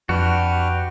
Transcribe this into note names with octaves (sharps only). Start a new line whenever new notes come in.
F2 D4 F#4 G4 B4 F6